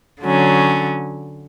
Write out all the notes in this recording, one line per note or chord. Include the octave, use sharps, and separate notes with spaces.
D3 F#3 C#4